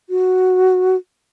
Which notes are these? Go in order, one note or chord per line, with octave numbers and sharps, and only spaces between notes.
F#4